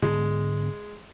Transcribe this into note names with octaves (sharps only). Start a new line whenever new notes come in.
G#2 D3 G#3 B3